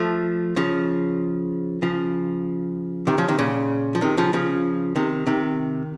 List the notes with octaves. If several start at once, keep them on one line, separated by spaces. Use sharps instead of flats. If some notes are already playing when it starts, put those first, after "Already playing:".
Already playing: F3 A3
C#3 F3
C#3 F3
C3 D#3
C#3 F3
C3 D#3
A#2 C#3
F3
C3 D#3
C#3 F3
C#3 F3
C3 D#3
C3 D#3